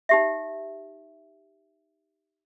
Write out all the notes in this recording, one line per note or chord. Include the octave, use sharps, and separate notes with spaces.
D#4 G4 E5